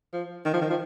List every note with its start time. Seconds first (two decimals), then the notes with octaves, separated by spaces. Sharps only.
0.13 F3
0.45 D#3
0.53 F3
0.61 D#3
0.70 F3